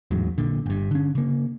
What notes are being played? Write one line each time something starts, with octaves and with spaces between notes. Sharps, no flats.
A1 E2 G#2 F#3
A#1 A#2 D3
G1 G2
D3 C#4
C#3 A#3